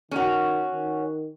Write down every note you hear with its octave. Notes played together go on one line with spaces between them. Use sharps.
D#3 C#4 F#4
D#3